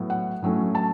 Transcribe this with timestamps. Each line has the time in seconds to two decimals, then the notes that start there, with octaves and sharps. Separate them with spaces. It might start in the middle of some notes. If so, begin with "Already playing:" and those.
Already playing: A2 F#3 B3
0.10 F#5
0.42 A2 F#3 A3 C#4
0.75 A5